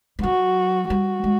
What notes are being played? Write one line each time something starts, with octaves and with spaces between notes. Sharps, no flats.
G3
F#3 F#4
G3 F#4
G#3